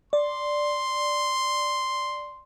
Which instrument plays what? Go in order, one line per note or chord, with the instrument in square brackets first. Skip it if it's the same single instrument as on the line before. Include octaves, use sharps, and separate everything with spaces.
[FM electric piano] D5 [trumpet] C6